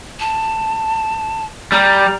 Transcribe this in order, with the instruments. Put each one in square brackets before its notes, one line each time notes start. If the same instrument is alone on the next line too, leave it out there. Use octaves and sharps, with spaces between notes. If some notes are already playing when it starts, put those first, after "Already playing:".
[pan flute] A5
[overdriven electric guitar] G3 [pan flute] A#5